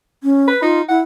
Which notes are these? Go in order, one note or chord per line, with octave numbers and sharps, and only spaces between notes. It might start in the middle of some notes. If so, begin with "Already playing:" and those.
C#4
B4
D#4 F4
E4 F#5